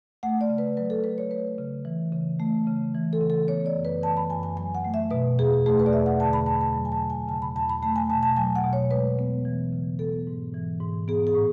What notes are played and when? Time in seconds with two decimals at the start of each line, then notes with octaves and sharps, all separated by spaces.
0.23 A3 F#5
0.41 D5
0.49 C#3
0.58 B4
0.77 F#3 B4
0.90 A4
1.04 C#3 B4
1.18 C#5
1.31 A3 B4
1.58 C#3
1.85 E3
2.12 C#3
2.40 A3
2.67 C#3
2.95 E3
3.13 A4
3.21 C#3
3.30 A4
3.48 B3 C#5
3.66 D5
3.75 F#2
3.85 B4
4.02 E3 A5
4.17 B5
4.30 F#2 G#5
4.43 G#5
4.57 F#3 G#5
4.75 F#5
4.85 A3
4.94 E5
5.11 B2 B4
5.39 E2 G#4
5.66 A3 G#4
5.79 B4
5.86 D5
5.92 E2 E5
6.06 F#5
6.20 D3 A5
6.33 B5
6.46 E2 A5
6.61 A5
6.74 F#3
6.85 G#5
6.92 A5
7.01 E2
7.10 G#5
7.28 C#3 A5
7.42 B5
7.55 E2 A5
7.69 B5
7.82 A3 A5
7.96 G#5
8.09 B2 A5
8.23 A5
8.37 F#3 G#5
8.56 F#5
8.63 B2
8.73 C#5
8.91 G#3 B4
9.19 B3
9.45 E3
9.72 C#3
9.99 B3 A4
10.27 G#2
10.54 E3
10.80 G#2
11.08 B3 G#4
11.27 G#4
11.35 A2